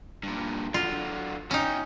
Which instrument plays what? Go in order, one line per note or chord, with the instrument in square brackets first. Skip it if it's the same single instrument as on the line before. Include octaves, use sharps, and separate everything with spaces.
[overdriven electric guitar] G2 A#2
[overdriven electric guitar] D3 F#3 [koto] F4
[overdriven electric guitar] E2 G5 [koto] C#4 D#4